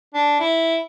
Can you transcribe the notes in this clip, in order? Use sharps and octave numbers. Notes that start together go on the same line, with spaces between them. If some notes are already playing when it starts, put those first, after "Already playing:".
D4
E4